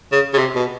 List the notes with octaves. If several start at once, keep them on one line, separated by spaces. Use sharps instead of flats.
C#3
C#3
C3
B2